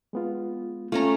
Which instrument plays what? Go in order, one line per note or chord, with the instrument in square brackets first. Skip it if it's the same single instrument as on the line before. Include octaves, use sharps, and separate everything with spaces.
[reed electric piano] G#3 B3 F4
[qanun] A3 C#4 A#5 [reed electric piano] F4